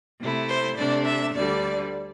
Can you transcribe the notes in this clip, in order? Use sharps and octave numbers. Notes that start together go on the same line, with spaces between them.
C3 A3 E4
C5
C3 A3 D4 D5
E5
D2 D3 G3 D5